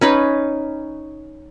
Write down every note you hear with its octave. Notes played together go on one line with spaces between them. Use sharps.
C#4 D#4 B4